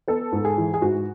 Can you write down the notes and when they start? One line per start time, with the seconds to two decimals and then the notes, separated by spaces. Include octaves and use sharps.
0.08 B3 A4
0.32 G#2
0.45 G#4
0.58 E3
0.74 G#4
0.82 G#2 F#4